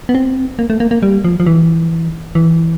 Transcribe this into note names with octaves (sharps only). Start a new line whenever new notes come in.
B3
C4
A#3
A3
A#3
A#3
G3
F3
F3
E3
E3